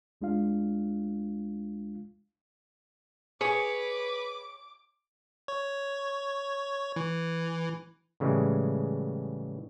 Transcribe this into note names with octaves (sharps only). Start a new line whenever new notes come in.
D2 G#3 D4 F4 F5
G#4 B4 C#5 D6
C#5
E3
A2 C#3 E3 G3 G#3